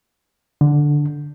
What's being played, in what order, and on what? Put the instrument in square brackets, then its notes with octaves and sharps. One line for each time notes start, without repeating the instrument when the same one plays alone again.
[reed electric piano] D3